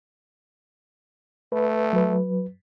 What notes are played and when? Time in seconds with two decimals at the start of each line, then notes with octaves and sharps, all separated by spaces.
1.52 A3 B4
1.93 F#3 B4